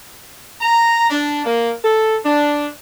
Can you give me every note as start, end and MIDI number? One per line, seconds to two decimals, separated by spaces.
0.61 1.08 82
1.10 1.43 62
1.46 1.71 58
1.83 2.17 69
2.25 2.66 62